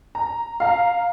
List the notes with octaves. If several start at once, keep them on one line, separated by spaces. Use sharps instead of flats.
A#5
F5 A#5